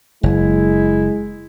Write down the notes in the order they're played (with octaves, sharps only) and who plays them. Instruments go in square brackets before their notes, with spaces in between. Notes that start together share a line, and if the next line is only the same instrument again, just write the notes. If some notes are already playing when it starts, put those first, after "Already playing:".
[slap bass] F#1 [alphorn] G#3 [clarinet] E4